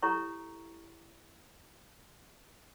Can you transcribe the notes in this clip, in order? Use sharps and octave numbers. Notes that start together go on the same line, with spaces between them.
E4 G4 A4 C#5 A#5 C#6